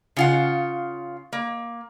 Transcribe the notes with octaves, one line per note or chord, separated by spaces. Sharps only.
C#3 F4 F#5
A#3